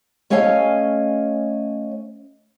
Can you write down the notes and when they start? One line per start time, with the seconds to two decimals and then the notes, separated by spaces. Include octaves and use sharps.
0.30 A3 C#4 C#5 D#5 F5 G#5